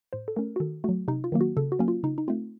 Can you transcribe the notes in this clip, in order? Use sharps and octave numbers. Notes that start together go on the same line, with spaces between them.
A2 C5
A4
A3 C#4 A#4
F#4
D#3 A4
F#3 A3 F#4
C3 D#4
F4
D#3 F#3 A#3
F#4
C#3 A4
F#4
F#3 A#3 C#4
F4
C#3 D#4
D#4
A3 C4 F4